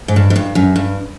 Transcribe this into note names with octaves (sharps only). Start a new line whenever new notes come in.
G#2
G2
G#2
G2
F#2
G2